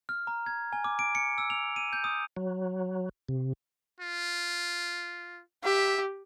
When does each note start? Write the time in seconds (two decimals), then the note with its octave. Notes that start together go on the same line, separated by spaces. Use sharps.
0.09 F6
0.27 A#5
0.46 G#6
0.73 G#5
0.84 D6
0.99 D7
1.15 C#7
1.38 E6
1.50 F7
1.76 D#7
1.93 G6
2.04 D#6
2.37 F#3
3.29 C3
4.00 F4
5.64 G4 E5